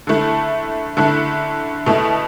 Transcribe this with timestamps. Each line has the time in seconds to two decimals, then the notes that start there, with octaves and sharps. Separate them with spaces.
0.07 D3 A3 E4
0.97 D3 A3 E4
1.86 B2 A3 E4